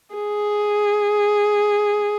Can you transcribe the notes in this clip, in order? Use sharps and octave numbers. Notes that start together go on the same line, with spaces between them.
G#4